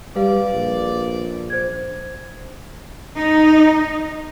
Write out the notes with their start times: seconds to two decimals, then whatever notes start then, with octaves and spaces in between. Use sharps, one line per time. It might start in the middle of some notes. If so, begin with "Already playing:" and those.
0.16 G3 B4 D5 F5
0.52 A#1
1.50 C5 G#6
3.19 D#4